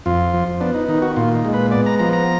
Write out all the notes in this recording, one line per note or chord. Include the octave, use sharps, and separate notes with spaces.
F2 F4
F3
B3 D4
D#4
D#3 D#4
F#4
A#2 F4
D#4
G#3
B4
B3 D5
A#5
F3 A#5
A#5